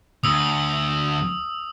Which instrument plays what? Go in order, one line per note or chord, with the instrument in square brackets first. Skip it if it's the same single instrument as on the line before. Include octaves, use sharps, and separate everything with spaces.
[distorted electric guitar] D2 [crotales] D#6 E6